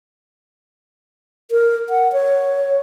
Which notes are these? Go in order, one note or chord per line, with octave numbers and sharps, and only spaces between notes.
A#4
F#5
C#5